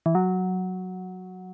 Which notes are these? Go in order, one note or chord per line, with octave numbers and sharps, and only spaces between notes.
E3
F#3